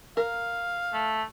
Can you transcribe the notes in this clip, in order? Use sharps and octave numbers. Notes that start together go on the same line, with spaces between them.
A#4 F5
A3